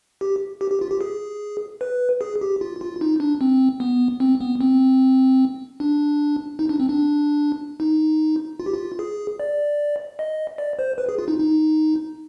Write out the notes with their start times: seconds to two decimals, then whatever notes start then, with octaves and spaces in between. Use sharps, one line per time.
0.21 G4
0.61 G4
0.71 G4
0.81 F4
0.91 G4
1.01 G#4
1.81 B4
2.21 G#4
2.41 G4
2.61 F4
2.81 F4
3.01 D#4
3.20 D4
3.41 C4
3.80 B3
4.20 C4
4.41 B3
4.61 C4
5.80 D4
6.59 D#4
6.69 D4
6.80 C4
6.89 D4
7.80 D#4
8.60 F4
8.66 G4
8.73 F4
8.99 G#4
9.40 D5
10.19 D#5
10.58 D5
10.79 C5
10.98 B4
11.09 G#4
11.18 F4
11.28 D#4
11.39 D#4